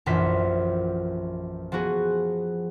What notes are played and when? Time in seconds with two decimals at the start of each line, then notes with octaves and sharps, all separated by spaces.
0.06 A#1 F#2 E3 F4 C5 B6
1.72 F3 B3 F#4 G#4